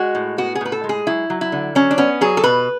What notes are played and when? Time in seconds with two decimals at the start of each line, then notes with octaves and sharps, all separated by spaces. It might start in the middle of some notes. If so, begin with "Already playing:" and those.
Already playing: G#3 F#4
0.15 A2
0.38 B3 F#4
0.55 G#4
0.61 A2 B4
0.72 A4
0.84 G#3
0.89 G#4
1.07 F#3 E4
1.30 F#3
1.41 E4
1.52 D3
1.75 F#3 C#4
1.91 D4
1.98 B3 C#4
2.21 F#3 G#4
2.37 A4
2.44 B2 B4